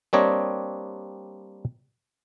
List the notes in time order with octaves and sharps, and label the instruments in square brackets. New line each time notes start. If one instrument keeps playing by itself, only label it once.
[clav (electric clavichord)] G3 A#3 C4 D4 C#5 D#5